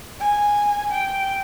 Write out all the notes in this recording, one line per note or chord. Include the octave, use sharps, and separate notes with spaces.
G#5
G5